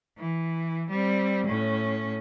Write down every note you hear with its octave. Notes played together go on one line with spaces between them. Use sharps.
E3
G3 C4
A2 C#4